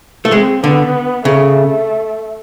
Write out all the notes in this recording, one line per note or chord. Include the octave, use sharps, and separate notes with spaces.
A3
G#3 C4
D3 B3
C#3 A3